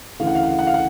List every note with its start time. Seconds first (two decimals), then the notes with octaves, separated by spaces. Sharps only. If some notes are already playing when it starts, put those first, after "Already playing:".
0.19 D2 C#3 E3 F5
0.27 F#5
0.35 F5
0.43 F#5
0.51 F5
0.59 F#5
0.67 F5
0.74 F#5